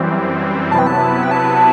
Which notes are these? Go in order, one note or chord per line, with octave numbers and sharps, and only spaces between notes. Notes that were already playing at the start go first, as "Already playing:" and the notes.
Already playing: F#2 E3 G3 C4
C3 F#3 B3 E4 B4 A5
G5
A5
G5
A5